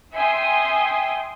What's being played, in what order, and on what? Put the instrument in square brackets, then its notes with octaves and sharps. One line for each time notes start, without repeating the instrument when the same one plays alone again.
[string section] E5 G5 G#5 C6 D#6